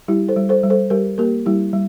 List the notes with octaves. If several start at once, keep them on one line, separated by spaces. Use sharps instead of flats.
G3 E4 G4
A4 C5
G3
A4 C5
G3
A4 C5
G3 G4 A#4
A#3 G4 A#4
G3 E4 G4
G3